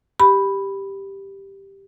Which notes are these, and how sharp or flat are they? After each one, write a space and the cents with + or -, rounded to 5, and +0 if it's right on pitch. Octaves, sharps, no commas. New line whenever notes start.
G4 +0 B5 +0